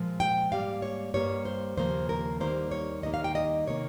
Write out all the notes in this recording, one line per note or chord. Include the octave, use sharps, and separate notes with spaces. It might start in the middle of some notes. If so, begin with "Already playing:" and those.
Already playing: A#2 F3 G#3
G5
G#2 G3 A#3 F5
C#5
G2 G3 A#3 C#5
C5
D#2 C#3 F3 A#3 C5
A#4
D#2 D#3 G3 A#3 C5
C#5
D#2 D#3 G3 A#3 D#5
F5
G5
D#5
C3 D#3 A#3 C#5